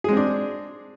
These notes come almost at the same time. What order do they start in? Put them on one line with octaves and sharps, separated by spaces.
G#4 G#3 C4 D4